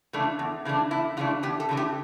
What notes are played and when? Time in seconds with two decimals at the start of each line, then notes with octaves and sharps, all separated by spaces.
0.13 C#3 E3 A3 D4
0.39 E2
0.65 C#3 E3 A3 D4
0.91 E2 E4
1.17 C#3 E3 A3 D4 F4
1.43 E2 G4
1.60 A4
1.69 C#3 E3 A3 D4
1.77 G4